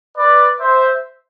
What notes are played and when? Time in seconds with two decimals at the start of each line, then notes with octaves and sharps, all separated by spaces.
0.17 B4 D5
0.60 C5 E5